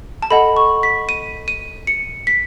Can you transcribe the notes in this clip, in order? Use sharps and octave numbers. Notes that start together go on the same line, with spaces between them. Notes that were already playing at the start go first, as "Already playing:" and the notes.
A5
A4 D#5 F#5 B5
C#6
B6
D#7
D#7
C#7
B6